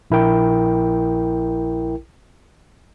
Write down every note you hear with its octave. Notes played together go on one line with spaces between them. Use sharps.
A#1 E4 A#4 G5